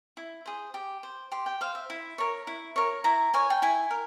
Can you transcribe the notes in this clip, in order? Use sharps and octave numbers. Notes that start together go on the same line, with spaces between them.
E4
G#4 C5
G4
C5
G4 C6
G5
C5 F5
E5
E4
A#4 C#5
E4
A#4 C#5
E4 A#5
A#4 C#5 G#5
G5
E4 G#5
A#4